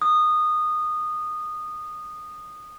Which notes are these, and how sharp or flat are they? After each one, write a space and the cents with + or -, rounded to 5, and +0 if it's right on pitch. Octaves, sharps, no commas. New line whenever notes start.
D#6 -20